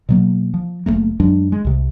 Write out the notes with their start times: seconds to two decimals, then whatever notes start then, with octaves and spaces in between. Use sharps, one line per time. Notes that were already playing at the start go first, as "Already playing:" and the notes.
0.09 B2 F#3 A#3
0.54 F3
0.86 F#1 G2 A3 A#3
1.20 F#2 F#3 G#3 D4
1.52 G#3
1.65 C2 C3